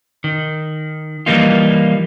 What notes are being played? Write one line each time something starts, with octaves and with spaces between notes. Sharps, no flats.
D#3
E3 F3 G3 A#3 D#4 F4